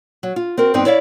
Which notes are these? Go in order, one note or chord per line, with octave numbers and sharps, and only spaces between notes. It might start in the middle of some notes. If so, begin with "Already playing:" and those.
F#3
F4
C4 F#4 A#4
G2 B3 C4 D#4 G5
E4 C#5 D5 E5 F5